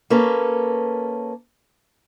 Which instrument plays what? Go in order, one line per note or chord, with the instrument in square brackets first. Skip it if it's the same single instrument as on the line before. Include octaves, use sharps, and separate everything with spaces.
[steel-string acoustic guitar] A#3 C#4 A4 B4